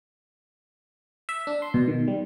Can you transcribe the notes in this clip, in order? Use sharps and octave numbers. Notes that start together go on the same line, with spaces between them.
E5
D4
C6
B2
D#3
G3